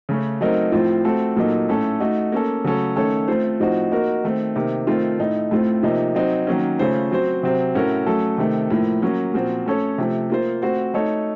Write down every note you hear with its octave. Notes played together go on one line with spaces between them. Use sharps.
C#3 A3 C#4
F#3 A3 C4 D#4 A#4
A2 F3 C4 F4
A3 C4 F#4 A4
A#2 F#3 A#3 D#4 A4
A2 A3 C#4 A4
A3 D#4 F#4
A#3 C#4 A4
C#3 F#3 A3 C#4 A4
D#3 A3 C#4 A4 C#5
A3 C4 F4 C5
A2 F3 C4 D#4 F#4
A#3 D#4 F#4 A#4
D#3 A3 C4
C3 D#3 A#3
D#3 A3 C4 F4
A2 A3 D#4
A2 A3 C4 F4
C3 F3 A#3 D#4
F#3 C4 D#4
D#3 F#3 A#3 C#4
C#3 A3 C#4 F4 C5
F#3 C4 F#4 C5
C3 F#3 C4
A2 A3 C#4 F#4 A#4
F#3 A3 C#4 A4
C3 D#3 A3
A2 F3 A#3
F#3 A#3 C#4
A#2 F3 C4 F#4
A3 C#4 A4 C#5
C3 F3 A3
A#3 F4 C5
A3 C4 F#4 C5
A3 D#4 A4 C#5